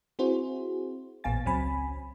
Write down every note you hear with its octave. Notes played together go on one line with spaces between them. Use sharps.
C4 E4 F#4 G#4 C5
A1 A#2 B3 F5 G#5 A6
C#2 F#3 C4 C#4 G#5 B5